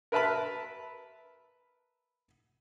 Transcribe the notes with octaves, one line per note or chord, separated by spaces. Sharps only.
A#4 B4 E5 A5 B5